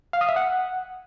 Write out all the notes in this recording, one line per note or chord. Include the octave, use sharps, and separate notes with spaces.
F5
D#6
E5
F#5